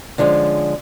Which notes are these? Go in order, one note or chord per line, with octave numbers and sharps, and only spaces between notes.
D3 F3 G#3 C4 C#4